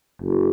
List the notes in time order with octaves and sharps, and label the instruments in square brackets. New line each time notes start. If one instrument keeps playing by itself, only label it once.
[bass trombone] F#1